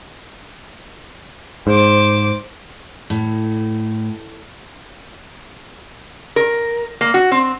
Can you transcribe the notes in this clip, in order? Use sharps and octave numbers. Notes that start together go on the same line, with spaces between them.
G#2 C5 D6
A2
A#4
A#3
F#4
C4